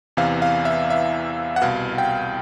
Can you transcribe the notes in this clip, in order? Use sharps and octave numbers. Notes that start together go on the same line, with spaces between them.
E2 C3 E3 F5
F5
E5
E5
F#5
C2 B2 F5
G5